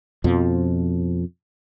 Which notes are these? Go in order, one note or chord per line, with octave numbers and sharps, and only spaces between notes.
F2 B2 F3